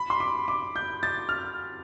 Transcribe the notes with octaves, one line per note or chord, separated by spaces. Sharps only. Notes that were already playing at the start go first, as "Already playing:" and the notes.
Already playing: B5
C6
D6
D6
G6
A6
F6